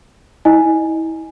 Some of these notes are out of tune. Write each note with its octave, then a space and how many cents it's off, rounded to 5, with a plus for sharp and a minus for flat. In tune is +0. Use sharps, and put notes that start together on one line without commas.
E4 -35 D#5 -15 G#5 +0